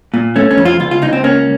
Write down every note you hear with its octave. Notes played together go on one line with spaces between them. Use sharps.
A#2
A3 C#4
C#4
F2
F4
C#2 F4
F4
C#2 D#4
C4
A#3 C#4